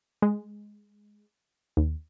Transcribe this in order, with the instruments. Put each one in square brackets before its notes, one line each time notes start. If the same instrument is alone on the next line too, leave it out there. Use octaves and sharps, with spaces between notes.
[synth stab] G#3
D#2